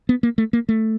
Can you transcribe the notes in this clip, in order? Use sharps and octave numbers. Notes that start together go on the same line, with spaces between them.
B3
A#3
A3
A#3
A3